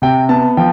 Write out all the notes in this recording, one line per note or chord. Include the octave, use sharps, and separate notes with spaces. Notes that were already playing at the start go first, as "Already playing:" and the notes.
C3 G5
B3 A5
F3 G5